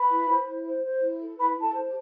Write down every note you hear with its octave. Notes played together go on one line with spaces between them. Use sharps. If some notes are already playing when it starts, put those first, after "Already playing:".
Already playing: B4 B5
E4
C5
E4
C5
C5
E4
A4
E4 B4 B5
E4
A4 A5
C5
G4